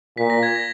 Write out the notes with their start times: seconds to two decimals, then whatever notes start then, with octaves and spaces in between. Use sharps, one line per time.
0.17 A#2 B6
0.30 A#6
0.43 G#6
0.56 A#6